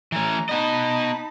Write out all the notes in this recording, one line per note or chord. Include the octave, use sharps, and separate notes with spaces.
E3 A3 C#4 A#5
B3 D#4 D#5 A5 B5